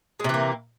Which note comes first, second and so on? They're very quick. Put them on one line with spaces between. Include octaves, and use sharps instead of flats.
G#3 C3 E3 A#3